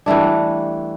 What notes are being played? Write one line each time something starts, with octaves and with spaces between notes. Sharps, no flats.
E3 G3 A3 D4